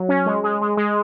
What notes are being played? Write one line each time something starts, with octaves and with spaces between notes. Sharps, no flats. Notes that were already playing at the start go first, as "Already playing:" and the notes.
Already playing: F#3
C#4
G#3
G#3
G#3
G#3